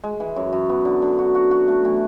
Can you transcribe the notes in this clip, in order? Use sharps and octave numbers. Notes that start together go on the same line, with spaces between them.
G#3
E3
F#2
F#2
B3
D3
D3
F#4
F#4
F#4
A3
E3